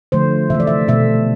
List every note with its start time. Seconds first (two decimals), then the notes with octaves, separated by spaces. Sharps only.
0.12 D3 F3 A3 C5
0.50 C3 E3 A3 E5
0.60 D5
0.67 E5
0.88 B2 A3 E5